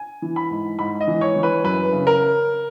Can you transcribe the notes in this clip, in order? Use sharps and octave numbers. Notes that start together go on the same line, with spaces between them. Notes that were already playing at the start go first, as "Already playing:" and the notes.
Already playing: G#5
E3
B5
G#2
G#2 B5
D#5
E3
C#5
E3
B4
F#2 B4
C#3
A#4